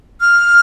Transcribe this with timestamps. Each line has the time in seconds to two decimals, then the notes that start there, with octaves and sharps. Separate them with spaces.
0.20 F6